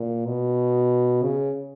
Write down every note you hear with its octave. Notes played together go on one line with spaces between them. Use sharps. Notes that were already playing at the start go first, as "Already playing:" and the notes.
Already playing: A#2
B2
C#3